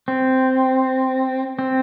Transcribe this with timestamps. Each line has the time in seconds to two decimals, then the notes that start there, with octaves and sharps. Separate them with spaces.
0.08 C4
1.59 C4